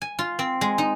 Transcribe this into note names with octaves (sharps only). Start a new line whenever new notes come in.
G#5
F4
C4
G#3
D#4